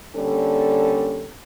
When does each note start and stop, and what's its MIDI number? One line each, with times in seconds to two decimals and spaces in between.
0.16 1.31 50
0.16 1.31 55
0.16 1.31 58
0.16 1.31 61
0.16 1.31 69